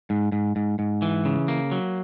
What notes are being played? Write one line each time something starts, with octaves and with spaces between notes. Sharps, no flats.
G#2
G#2
G#2
G#2
E3
C#3
A#3
F#3